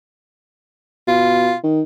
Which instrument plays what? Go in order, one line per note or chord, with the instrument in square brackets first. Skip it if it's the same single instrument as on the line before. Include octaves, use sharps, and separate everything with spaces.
[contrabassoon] B2 [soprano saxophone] F4
[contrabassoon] D#3